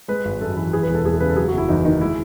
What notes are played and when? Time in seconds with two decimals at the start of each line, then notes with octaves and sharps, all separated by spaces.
0.08 G#3 B4
0.25 G#1
0.41 F#2 A4
0.57 E3
0.73 E3 G#4
0.83 B4
0.88 E1
0.95 A4
1.05 E2 G#4
1.14 A4
1.20 C#3 B4
1.30 A4
1.36 F#3 G#4
1.48 F#4
1.53 F#1 E4
1.69 E2 D#4
1.85 D#3 D#4
2.01 G#3 E4